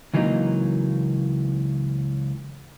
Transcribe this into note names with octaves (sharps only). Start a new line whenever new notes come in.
C#2 E3 F#3 A#3 D#4